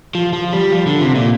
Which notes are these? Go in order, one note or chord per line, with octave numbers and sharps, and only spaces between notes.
F3
F3
G3
F3
D3
C3
A#2